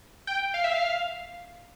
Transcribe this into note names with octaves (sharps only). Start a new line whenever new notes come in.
G5
F5
E5
F5